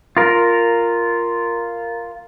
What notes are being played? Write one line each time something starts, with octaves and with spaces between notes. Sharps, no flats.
F4 A#4